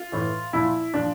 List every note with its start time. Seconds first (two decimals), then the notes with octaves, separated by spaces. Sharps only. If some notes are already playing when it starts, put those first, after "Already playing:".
Already playing: F4
0.12 A2 E3
0.53 A#2 F3 E4
0.94 A#2 F3 D4